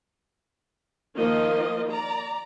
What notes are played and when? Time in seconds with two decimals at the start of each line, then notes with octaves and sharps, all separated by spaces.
1.17 D#3 F3 A#3 F4 D#5
1.91 D5 A#5